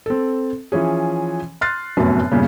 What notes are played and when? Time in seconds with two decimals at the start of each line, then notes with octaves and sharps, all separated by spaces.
0.06 C4 A4
0.72 E3 F3 C#4 G#4
1.61 C6 F6 F#6 A6 C7
1.97 F1 F#2 A2 B3
2.32 E2 G2 A#2 C#3